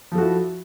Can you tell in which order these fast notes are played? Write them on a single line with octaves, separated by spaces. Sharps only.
F3 A4 F#4 E4